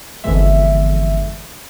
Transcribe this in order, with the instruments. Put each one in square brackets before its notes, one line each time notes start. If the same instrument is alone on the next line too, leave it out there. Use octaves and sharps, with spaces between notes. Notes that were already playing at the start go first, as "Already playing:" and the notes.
[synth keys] G1 F2 D3 E3 G#3 E5